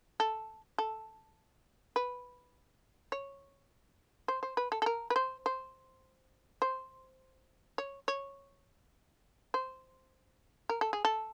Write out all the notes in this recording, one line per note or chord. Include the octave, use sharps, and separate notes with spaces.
A4
A4
B4
C#5
C5
C5
B4
A4
A4
A#4
B4
C5
C5
C5
C#5
C#5
C5
A#4
A4
G#4
A4